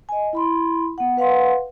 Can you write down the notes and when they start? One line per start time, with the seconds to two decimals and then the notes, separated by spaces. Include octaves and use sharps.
0.09 D#5 G#5
0.33 E4 B5 C6
0.98 B3 F#5
1.17 B4 F5 F#5 C6